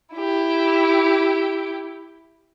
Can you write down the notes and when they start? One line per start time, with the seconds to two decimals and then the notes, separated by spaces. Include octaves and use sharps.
0.15 E4 G4